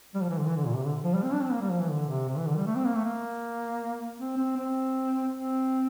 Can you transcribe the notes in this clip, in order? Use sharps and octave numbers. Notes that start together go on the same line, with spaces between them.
G3
F3
E3
D3
E3
D3
A#2
C3
D3
F3
G3
C4
D4
C4
A#3
G3
F3
E3
D3
C3
C3
E3
D3
G3
A3
C4
A#3
A3
A#3
C4
C4
C4
C4